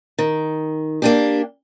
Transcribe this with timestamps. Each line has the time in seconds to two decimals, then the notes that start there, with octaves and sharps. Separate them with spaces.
0.19 D#3
1.02 A#3 D4 G4